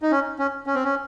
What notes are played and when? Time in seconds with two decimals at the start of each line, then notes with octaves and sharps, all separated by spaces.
0.02 D#4
0.11 C#4
0.39 C#4
0.67 C#4
0.75 C4
0.84 C#4